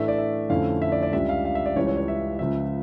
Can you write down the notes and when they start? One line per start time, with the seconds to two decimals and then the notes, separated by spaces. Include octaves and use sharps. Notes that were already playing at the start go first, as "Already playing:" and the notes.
Already playing: A2 E3 A3 D4 E5
0.08 D5
0.18 E5
0.50 F2 D3 A3 C#4 E4 F5
0.82 E5
0.92 D5
1.03 D5
1.13 C#2 C#3 G3 D4 E5
1.29 F5
1.45 F5
1.55 E5
1.66 D5
1.76 C#2 C#3 E3 G3 C#4 C#5
1.87 C#5
1.97 C#5
2.08 E5
2.39 C#2 C#3 F3 E5